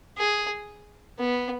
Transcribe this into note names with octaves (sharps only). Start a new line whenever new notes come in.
G#4
B3